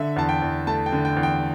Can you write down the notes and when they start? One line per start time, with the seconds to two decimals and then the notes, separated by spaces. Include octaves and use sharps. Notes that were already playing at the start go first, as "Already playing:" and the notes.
Already playing: D3 E5
0.16 E2 A5
0.29 G5
0.42 E2
0.67 A3 A5
0.86 G5
0.92 D3
1.05 G5
1.17 E2
1.23 G5